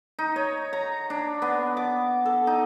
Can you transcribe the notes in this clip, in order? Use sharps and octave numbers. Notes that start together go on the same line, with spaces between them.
D#4
C#5
A#5
D4
B3
D6
A4
D#4